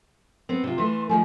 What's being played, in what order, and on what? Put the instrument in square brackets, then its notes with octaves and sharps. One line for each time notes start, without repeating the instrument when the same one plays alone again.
[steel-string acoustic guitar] B3 C4
C3 F4
[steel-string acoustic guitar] E3 A3 [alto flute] C6
[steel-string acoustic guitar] D#3 F3 A3 [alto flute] G#5